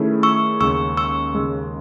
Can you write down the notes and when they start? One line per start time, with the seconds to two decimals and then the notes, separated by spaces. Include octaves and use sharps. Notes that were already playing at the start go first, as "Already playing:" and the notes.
Already playing: D#3 A3 C#4 E4 G#4
0.23 C#6 E6
0.60 D#2 C#3 G#3 C#6 E6
0.97 C#6 E6
1.35 D#2 C#3 G#3